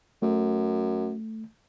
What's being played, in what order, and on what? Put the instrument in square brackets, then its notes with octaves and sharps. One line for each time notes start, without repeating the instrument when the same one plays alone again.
[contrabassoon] F#2 [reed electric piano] A3